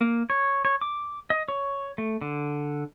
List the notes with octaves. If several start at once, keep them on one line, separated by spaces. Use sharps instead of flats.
A#3
C#5
C#5
D6
D#5
C#5
A3
D3